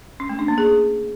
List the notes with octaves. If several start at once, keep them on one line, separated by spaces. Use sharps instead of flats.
C#4
A3
D4
A#3
G#4